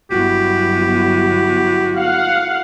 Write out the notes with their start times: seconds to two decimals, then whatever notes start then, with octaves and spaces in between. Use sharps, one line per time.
0.11 G1 F#3 B3 E4 F#4 G4
1.97 F5 F#5